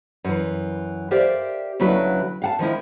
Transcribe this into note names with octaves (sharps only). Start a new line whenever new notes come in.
F#2 E3
G4 A#4 C5 D5 E5 F5
D2 C#3 F#3 E4 F#4 B4
F5 F#5 A5
D#3 F3 G#3 E4